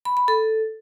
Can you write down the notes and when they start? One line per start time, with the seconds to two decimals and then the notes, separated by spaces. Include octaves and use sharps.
0.05 B5
0.17 B5
0.28 A4